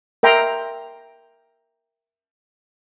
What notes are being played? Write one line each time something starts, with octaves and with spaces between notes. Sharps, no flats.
A#4 E5 G5 A#5 C6